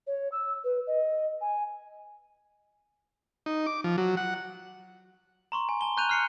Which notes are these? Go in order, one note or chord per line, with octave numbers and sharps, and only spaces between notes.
C#5
E6
B4
D#5
G#5
D#4
D6
F3
F#3
F#5
A#5 C6 C#6
G#5
A5 G7
A#5 C#6 F#6 G6 D#7 F7
F6 C7 C#7